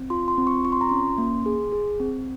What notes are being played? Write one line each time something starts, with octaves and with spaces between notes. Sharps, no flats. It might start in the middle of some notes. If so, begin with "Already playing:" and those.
Already playing: C4
F4 C6
C6
C4
C#6
F4 C#6
C6
A#5
C#4 C6
A#3
G#4
G#4
C4